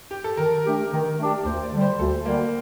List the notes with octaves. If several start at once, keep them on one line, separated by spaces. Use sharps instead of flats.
G4
A4
D#3 A#4
A3 D4 G4
D#3 A#4
A3 D4 G4
D2 C5
D5
D3 G3
C5
D2 A4
D3 G3 A#3